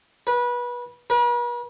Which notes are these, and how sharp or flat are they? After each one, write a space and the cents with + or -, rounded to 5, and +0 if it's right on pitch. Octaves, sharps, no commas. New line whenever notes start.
B4 -25
B4 -45